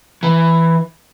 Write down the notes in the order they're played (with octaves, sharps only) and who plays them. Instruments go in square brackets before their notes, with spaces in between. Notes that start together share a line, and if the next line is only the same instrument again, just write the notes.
[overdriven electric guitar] E3